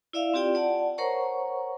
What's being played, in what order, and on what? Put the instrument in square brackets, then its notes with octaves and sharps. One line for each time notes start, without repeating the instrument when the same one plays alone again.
[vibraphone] E4 D5 E5 F5 E6
C4 F4 G4 D5 G5
D5 F#5 A5
A#4 C5 C#5 F#5 A#5 C#6